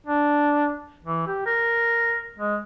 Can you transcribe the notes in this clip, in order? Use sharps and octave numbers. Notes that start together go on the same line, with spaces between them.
D4
E3
G4
A#4
G#3